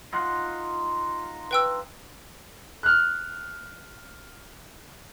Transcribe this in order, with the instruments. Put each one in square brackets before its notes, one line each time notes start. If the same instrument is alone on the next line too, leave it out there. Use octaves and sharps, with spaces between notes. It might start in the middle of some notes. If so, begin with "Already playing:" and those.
[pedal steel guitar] D#4 F4 F#5
[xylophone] B4 G5 E6
[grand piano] F6 F#6